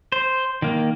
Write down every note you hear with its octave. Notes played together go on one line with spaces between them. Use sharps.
C5
D#3 A#3